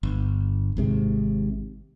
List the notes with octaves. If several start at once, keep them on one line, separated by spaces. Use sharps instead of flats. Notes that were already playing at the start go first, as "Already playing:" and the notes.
G1
G#1 G#2 C3